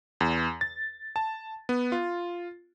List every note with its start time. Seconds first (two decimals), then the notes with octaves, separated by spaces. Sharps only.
0.21 E2
0.61 A6
1.16 A5
1.69 B3
1.92 F4